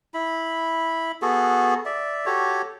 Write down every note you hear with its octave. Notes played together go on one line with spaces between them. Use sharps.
E4 B5
B3 F#4 G#4 A4
D5 E5
F#4 G4 A4 C#5